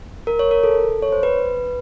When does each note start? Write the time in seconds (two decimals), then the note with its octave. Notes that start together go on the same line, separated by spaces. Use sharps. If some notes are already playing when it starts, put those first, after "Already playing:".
0.27 A#4
0.39 C#5
0.51 A#4
0.64 A4
1.02 C#5
1.12 C5
1.23 B4